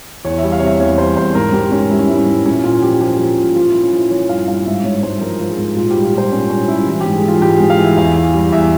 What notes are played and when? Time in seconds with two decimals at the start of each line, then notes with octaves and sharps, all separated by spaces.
0.25 E2 C#5
0.38 G3 E5
0.52 F5
0.59 C3 C#5
0.66 E5
0.80 E2 C#5
0.98 G3 C5
1.17 E2 C5
1.35 G#2 A#4
1.53 G#2 G4
1.71 G#2 C#4
1.90 G3 E4
1.99 C#4
2.08 G#2 E4
2.18 C#4
2.26 G#2
2.45 A#2 C#4
2.64 A#2 F4
2.82 F3 G4
3.01 F3 G4
3.19 F3
3.37 A#2
3.56 F3 F4
3.70 F3 E4
3.83 C#4
3.92 F3
3.97 E4
4.11 F3 C#5
4.29 G2 F5
4.48 G2 F5
4.66 G#2 E5
4.84 G#2 C#5
5.03 G#2 C5
5.21 F3 A#4
5.40 F3
5.49 G#4
5.58 G#2
5.76 A#2 F4
5.91 G3 G4
6.04 F4
6.14 A#2 C5
6.32 A#2 C#4
6.50 G3 C#4
6.68 G3 E4
6.87 E3
7.01 G4
7.06 G#2
7.14 G#4
7.24 E3 F4
7.42 G#2 G4
7.56 G#2 G#4
7.70 F5
7.79 E3 E5
7.97 E2 F5
8.16 E3
8.34 G3
8.52 E2 E5